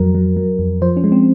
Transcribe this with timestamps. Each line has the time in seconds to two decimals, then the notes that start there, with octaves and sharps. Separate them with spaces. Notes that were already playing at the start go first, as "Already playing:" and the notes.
Already playing: F2 F#3 A#4
0.15 F#3
0.37 F#3
0.59 F2
0.82 F3 C5
0.97 C#4
1.04 G#3
1.12 C4